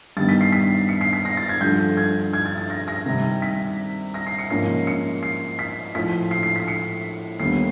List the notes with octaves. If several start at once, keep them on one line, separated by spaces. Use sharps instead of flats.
G2 D#3 G3 B3 A6
B6
C7
B6
C#7
C7
B6
A#6
A6
G#6
G2 D3 F3 A3 G6
G#6
G#6
A6
A6
A#6
A#6
C3 D#3 G3 C4
B6
A#6
C7
C#7
G#2 F3 A#3 C#4 C7
C#7
C7
B6
A2 F3 A3 B6
C7
C7
B6
C#7
D#2 D3 G3 B3 C7